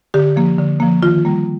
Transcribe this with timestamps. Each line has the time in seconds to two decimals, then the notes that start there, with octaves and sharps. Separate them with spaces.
0.14 D3 G4
0.36 F3 A#3
0.58 D3
0.80 F3 A#3
1.02 D#3 F4
1.25 G3 A#3